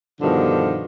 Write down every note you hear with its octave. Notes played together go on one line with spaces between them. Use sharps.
G2 B2 D3 D#3 F3